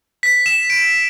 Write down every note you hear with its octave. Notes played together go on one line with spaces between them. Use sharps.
B6
E7
D7